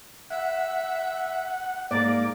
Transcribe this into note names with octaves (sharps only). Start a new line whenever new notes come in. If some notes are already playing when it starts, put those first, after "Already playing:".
E5 F#5
G#2 A#3 D5 D6